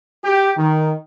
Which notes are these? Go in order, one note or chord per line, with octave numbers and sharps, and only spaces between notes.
G4
D#3